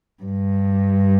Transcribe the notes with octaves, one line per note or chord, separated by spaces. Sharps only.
G2